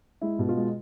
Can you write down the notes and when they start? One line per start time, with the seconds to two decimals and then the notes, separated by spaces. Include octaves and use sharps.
0.21 G#3 E4
0.39 B2
0.49 F4
0.57 G#3